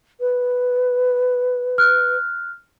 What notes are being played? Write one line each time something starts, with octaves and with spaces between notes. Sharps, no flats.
B4
F6 F#6